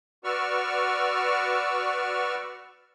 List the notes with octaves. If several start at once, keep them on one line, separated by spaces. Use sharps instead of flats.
F#4 B4 D5 C#6 E6 F6